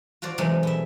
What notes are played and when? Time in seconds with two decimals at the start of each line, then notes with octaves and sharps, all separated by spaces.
0.22 F4 F#4 C5 D5
0.38 C3 E3 F#3 G#3 A3 C4
0.63 B2 E5